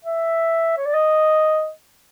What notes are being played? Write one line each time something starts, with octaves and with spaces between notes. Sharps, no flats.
E5
C#5
D5
D#5